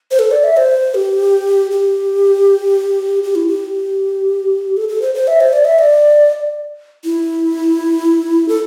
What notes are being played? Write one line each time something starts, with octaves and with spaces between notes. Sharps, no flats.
C5
A4
D5
E5
C5
G4
G4
G4
E4
G4
A4
A4
C5
C5
E5
C5
D5
E5
D5
E4
A4